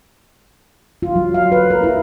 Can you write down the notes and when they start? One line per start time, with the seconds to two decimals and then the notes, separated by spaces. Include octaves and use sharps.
1.02 F4
1.16 F#3
1.34 F5
1.52 B4
1.70 A#4
1.83 E4